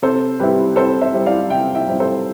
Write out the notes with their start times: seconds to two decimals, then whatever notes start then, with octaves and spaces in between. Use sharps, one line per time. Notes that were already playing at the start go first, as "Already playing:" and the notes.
0.02 C3 A4 C5
0.40 G3 C4 E4 G4 B4
0.76 C3 A4 C5
1.01 C5 E5
1.14 G3 C4 E4
1.26 D5 F5
1.50 C3 E5 G5
1.75 E5 G5
1.87 G3 C4 E4
2.00 A4 C5